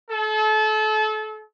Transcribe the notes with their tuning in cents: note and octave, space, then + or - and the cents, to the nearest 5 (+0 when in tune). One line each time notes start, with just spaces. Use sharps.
A4 -30